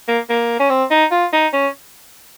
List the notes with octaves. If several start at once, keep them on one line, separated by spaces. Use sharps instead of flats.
A#3
A#3
C#4
C4
D#4
F4
D#4
C#4